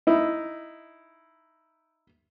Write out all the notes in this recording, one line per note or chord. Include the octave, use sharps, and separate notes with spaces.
D#4 E4